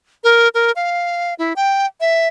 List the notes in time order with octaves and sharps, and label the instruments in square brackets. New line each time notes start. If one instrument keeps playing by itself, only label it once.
[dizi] A#4
A#4
F5
E4
G5
E5